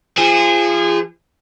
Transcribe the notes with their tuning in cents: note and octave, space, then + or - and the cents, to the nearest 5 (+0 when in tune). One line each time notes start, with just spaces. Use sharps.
F3 -30 G#4 -25